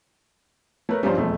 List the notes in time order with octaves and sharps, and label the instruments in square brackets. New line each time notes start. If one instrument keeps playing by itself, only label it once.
[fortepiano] A3 [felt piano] A#4 B4 C#5
[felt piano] G2 F3 G3 [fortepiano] C#4 C5
[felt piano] E1 F2 A3